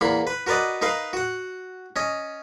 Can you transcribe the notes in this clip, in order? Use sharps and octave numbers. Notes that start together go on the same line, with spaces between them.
E2 A#3 B5
B4
F#4 A#4 B4 D5 D#5
D#4 A#4 B4 F5
F#4 F#5
C#4 D#5